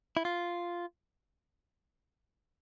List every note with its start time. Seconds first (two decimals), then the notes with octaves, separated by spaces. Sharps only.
0.17 E4
0.25 F4